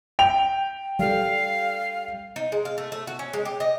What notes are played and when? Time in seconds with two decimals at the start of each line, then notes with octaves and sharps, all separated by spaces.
0.19 G5 F7
0.99 G3 A4 F5
2.36 D#4
2.52 G#3
2.65 F5
2.78 A3
2.92 A3
3.07 F#4
3.19 C#4
3.33 G#3
3.45 G4
3.60 D#5